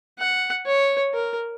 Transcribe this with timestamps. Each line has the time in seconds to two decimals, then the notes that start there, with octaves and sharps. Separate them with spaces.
0.19 F#5
0.66 C#5
1.14 A#4